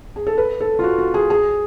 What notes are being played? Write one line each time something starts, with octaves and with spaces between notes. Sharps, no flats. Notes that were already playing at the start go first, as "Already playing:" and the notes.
G#4
A4
B4
A4
F4
F#4
F#4
G#4
G#4